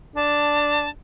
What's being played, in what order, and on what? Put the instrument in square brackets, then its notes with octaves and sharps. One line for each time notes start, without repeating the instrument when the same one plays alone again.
[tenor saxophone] D4 [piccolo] A5